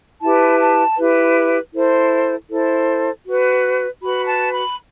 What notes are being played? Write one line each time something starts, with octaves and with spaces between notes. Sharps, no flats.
E4 G4 B4 A5
A5
E4 G4 B4
E4 A4 C5
E4 A4 C5
F#4 B4
F#4 B4 B5
A5
B5